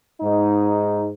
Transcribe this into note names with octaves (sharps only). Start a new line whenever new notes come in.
G#2 D#4